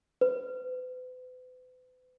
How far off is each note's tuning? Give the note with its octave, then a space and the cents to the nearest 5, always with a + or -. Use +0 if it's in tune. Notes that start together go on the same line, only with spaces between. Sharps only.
B4 +40